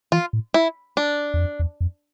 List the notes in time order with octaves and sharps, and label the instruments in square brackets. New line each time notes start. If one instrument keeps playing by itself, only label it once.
[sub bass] E3 [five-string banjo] F4
[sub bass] A2
[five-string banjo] E4
D4
[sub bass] E2
F2
E2
F2